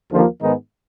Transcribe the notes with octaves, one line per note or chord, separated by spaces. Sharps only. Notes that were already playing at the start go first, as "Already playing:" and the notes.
D#2 D3 F3 A#3
G#2 D#3 G#3 B3 D#4